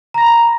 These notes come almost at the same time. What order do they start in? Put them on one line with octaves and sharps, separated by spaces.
A#5 A#6 B5